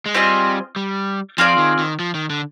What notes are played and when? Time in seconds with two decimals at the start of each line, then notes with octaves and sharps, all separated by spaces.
0.06 G#3
0.14 G3 C4 F4 G#4 D#5
0.76 G3
1.38 F3 C4 F4 G#4 D5
1.58 D#3
1.79 D#3
2.00 F3
2.14 D#3
2.30 D3